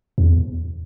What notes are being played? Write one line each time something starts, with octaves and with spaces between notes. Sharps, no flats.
E2